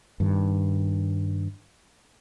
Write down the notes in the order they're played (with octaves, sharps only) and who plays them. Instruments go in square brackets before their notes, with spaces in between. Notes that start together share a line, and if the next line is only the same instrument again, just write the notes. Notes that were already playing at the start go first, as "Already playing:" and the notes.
[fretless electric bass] G2 D#3